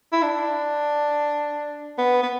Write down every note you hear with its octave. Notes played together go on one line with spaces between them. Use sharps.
E4
D4
B3
B3